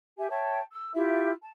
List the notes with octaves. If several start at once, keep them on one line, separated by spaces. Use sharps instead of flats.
G4 E5 G#5
C#5 E5 G5 A5
E6
E4 F4 G4 E5
A5